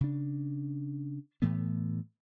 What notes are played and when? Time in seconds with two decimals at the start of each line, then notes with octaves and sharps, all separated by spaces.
0.01 C#3 D4
1.42 A2 E3 A3 B3